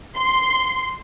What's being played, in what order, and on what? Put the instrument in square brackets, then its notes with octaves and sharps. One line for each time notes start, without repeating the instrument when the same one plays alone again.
[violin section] C6